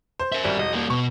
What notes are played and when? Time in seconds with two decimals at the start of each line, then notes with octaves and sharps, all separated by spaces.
0.20 C5
0.32 A#4 E5
0.44 G#1 G3
0.59 E1 D#5
0.73 G3 A#3
0.90 B2 C#6